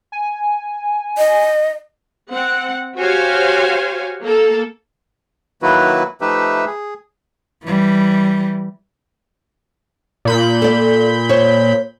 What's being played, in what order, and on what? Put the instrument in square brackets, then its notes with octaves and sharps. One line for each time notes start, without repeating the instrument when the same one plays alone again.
[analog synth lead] G#5
[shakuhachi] D#5
[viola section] C4 F#5
F#4 G4 C5 C#5 F5 G#5
A#3 A4
[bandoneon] D#3 F#3 A#3 E4 F#4 B4
F3 A3 D#4 G4 B4 E5
G#4
[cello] E3 G3
[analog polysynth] A#2 B5 G6
[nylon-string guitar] A4 D5
C5 C#5